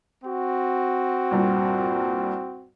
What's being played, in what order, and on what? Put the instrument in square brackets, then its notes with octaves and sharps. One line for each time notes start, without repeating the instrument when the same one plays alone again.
[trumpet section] C4 F#4
[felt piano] C2 G2 A#2